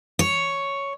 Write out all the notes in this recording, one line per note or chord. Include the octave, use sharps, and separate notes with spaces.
C#5